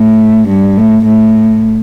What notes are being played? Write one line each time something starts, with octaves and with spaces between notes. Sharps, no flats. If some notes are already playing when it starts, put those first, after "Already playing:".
Already playing: A2
G2
A2
A2